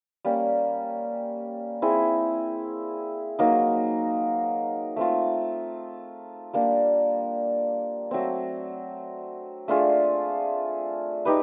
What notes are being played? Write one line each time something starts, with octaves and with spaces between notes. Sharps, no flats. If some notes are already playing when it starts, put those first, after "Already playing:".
G3 A#3 C#4
C4 E4 G#4
F#3 A#3 D#4
A3 C4 F4
G3 A#3 D4
F#3 A3 C4
A3 D4 F4 G#4
D#4 G4 B4